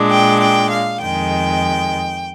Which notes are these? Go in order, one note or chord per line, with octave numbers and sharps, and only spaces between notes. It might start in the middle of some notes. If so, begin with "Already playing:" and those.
Already playing: A#2 G#3 D4
G5
G5
F5
F2 D#3 G#3 G5